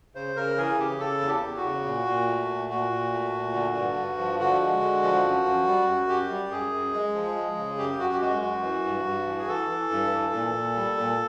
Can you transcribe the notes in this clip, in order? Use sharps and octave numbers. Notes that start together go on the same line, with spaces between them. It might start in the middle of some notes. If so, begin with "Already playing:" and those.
C#3 C5
C#3 A#4
E3 G#4
C#3 G4
C#3 A4
E2
G4
E2
F#4
C#3
A#2
A#2
A3
A#2
A#2 F#4
A#2
A3
A#2
D3
G2
G2
F3
D3 F#4
G#3
D3
F3
F#2
F#2
G3
F#2
F#2 G4
G3
F#2 G#4
F#2
G#3
F3
G#3
C#3
F#2 G4
F#2 F#4
G4
G#3 F#4
F#2 F#4
E3
G2
G2
E3
G#4
E3 A4
E3
G2
E3
A#2
A#2
G3
A#2